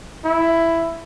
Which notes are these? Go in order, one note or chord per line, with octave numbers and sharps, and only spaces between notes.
E4